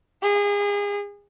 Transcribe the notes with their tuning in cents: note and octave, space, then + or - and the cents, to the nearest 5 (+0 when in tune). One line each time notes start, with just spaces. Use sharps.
G#4 -30